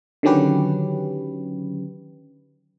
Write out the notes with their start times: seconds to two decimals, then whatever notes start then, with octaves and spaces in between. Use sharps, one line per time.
0.23 D3 D#3 F#3 C#4 G4 B4